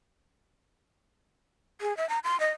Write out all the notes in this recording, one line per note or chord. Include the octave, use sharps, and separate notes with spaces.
G#4
E5
A#5
C6
D#5